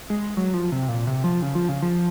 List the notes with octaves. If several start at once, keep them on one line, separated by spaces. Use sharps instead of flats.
G#3
F#3
F3
C3
A#2
C3
F3
C#3
F3
C#3
F3